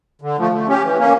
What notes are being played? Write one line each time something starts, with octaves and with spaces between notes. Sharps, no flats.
D3
F3 A3
A3
C#4 G4
E3
A#3 C#4